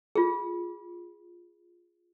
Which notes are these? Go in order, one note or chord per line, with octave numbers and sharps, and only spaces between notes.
F4 G#4